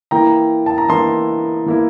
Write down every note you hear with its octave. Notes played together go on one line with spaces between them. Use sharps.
E3 A#3 E4 G5 A#5
A5
A#5
E3 A#3 E4 A5 C6
E3 A#3 E4